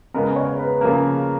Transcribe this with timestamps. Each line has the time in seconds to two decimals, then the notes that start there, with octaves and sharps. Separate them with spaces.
0.14 C#3 G#3 B3 A#4
0.36 C#5
0.59 B4
0.81 C#3 F3 A#3 A#4